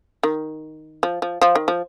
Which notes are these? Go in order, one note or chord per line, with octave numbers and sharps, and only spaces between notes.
D#3
F3
F3
F3
D#3
F3